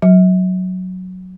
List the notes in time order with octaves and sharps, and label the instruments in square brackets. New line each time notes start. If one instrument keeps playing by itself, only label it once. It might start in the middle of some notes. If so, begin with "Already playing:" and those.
[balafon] F#3